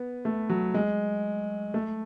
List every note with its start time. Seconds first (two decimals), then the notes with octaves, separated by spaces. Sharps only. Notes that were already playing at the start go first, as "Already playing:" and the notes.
Already playing: B3
0.25 A3
0.49 F#3
0.74 G#3
1.74 A3